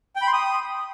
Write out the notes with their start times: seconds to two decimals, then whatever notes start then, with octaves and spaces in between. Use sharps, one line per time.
0.16 G5
0.22 B5
0.27 C6
0.33 D#6